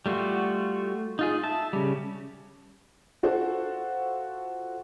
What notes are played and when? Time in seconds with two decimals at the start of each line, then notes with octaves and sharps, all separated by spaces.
0.06 G3 A3 F4 F#4
1.19 D#4 F4 G#4
1.44 E5 A5
1.73 C#3 G3
3.23 F4 F#4 A4 C5 F#5